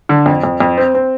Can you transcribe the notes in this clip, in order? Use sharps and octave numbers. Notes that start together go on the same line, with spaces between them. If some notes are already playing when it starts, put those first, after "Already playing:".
D3
F2
F2
F2
C4
C4